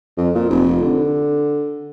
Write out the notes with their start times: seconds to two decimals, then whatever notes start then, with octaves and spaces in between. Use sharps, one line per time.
0.17 F2
0.35 A#2
0.50 F1
0.82 D3